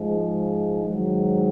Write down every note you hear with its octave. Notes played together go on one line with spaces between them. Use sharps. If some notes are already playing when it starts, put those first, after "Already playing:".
Already playing: G#2 F3 G#3
G#2 D#3 F#3